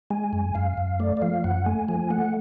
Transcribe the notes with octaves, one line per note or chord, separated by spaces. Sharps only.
G#3 G#5
F#2
F#2 F5
F#2
A3 D5
D5
F3 F5
F#2 F#5
A3 G#5
F3 G#5
A3 F#5